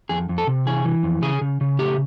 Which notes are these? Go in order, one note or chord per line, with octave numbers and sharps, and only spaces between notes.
F2 G#4
F2
A4
C3
E3 G#4
E3
F2
C#3 G#4
C#3
C#3
A3 G4